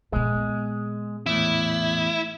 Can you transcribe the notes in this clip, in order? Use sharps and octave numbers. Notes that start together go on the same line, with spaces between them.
A#2 G#3 B3
E2 A2 E4